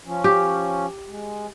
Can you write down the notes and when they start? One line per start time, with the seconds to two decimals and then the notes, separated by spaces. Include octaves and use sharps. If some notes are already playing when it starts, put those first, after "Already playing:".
0.05 F3 C#4
0.24 G4
1.09 G#3